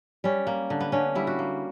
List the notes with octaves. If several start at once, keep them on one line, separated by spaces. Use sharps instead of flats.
G3 C#4
A#3
D3
B3
D3 C#4
G3 E4
F#4
A#3